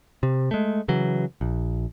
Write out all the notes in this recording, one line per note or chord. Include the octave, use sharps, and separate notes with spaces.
C3
G#3 A3
C#3 E3 F#3
A#1